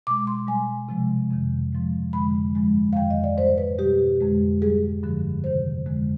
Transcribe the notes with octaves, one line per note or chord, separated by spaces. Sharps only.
B2 G#3 D6
C6
B2 G3 G#5
C3 F3 G#3
F2 C3 D#3
G#2 F3 G#3
F2 D3 G#3 B5
G2 F3 G#3
F5
F2 D#3 G#3 G5
D#5
D5
G#2 G3 C5
B4
B2 G3 G4
F2 D3 G#3
G#2 G3 G#4
G2 D3 F3
F2 C3 D#3 C5
F2 D3 F3 G#3